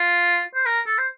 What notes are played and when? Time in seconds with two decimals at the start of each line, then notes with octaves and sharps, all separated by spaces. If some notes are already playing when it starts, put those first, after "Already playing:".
Already playing: F4
0.55 C5
0.66 A#4
0.86 A4
0.98 C5